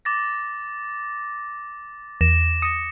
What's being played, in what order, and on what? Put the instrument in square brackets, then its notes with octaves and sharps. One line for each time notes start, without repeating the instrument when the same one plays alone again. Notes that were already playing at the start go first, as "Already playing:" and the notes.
[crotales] D6 A6 A#6
[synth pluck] E2 [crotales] A#6 E7
[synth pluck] D#6 [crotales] A#6 C#7